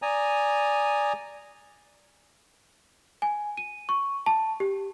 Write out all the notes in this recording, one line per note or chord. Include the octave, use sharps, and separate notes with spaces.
D5 G#5 A#5 D#6
G#5
D#7
C#6
A5
G4